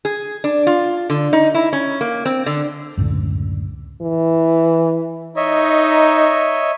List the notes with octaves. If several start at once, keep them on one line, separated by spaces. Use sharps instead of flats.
G#4
D4
F4
D3
D#4
E4
C#4
A#3
C4
D3
C#2 F#2 A2 D3
E3
D#4 C#5 D#5 E5